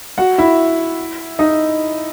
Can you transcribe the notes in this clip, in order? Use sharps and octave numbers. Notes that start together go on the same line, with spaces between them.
F#4 F#5
E4 E5
D#4 D#5